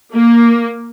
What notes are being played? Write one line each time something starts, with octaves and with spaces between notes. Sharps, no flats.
A#3